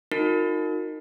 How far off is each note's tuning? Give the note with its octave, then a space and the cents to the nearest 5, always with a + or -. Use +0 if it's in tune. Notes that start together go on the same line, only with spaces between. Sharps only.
D#4 +0 F#4 -45 A#4 -20